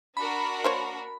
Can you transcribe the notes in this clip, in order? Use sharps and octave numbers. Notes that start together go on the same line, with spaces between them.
D4 F#4 A#4 B5
A#3 C5 C#5